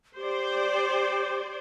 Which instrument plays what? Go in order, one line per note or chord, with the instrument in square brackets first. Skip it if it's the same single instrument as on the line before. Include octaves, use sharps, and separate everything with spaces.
[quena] G4 [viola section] C5 D5